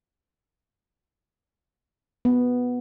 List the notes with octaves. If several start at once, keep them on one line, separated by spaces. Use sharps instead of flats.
B3